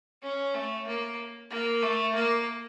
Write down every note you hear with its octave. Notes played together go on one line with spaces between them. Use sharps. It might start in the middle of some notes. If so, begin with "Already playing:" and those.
C#4
A3
A#3
A#3
A3
A#3